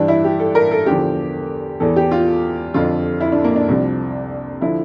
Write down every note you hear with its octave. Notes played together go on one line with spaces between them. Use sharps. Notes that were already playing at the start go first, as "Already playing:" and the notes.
Already playing: G2 E3 D4
E4
G4
A4
A#4
A4
E2 D3 F3 G4
E2 E3 A4
G4
F4
F2 D3 F3 F4
E4
D4
A#3
D4
C2 C3 F3
D3 F3 E4